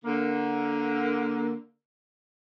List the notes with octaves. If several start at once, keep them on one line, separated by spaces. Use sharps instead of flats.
D3 A#3